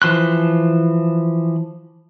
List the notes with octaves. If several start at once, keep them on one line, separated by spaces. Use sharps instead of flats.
E3 F3 C6 F#6